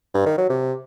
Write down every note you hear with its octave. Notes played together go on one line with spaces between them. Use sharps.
G2
D#3
F#3
C3